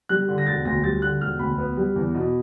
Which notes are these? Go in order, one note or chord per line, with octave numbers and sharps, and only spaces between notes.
G3 F#6
D3
A#6
E1 A6
D2 A#6
G3 A6
D3 F#6
E1 F6
D2 B5
B3
G3
E2
B2